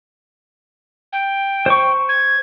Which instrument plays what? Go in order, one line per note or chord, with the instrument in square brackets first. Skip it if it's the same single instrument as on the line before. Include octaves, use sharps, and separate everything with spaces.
[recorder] G5
[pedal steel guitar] C5 C#6
[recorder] G#6